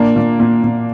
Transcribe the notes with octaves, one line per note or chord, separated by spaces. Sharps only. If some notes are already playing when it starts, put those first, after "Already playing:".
Already playing: A#2 A#3 D4
A#2
A#2
A#2